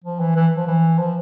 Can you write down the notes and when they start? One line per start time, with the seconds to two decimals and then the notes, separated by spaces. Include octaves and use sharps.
0.04 F3
0.20 E3
0.36 E3
0.57 F3
0.67 E3
0.98 F3